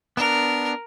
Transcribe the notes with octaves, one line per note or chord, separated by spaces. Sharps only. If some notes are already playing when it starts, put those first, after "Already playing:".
B3 D4 A#4